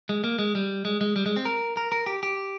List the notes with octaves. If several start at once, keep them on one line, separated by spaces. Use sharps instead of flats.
G#3
A#3
G#3
G3
G#3
G#3
G3
G#3
C4
A#4
A#4
A#4
G4
G4